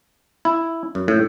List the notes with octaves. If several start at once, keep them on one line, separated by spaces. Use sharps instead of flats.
E4
F#2
A2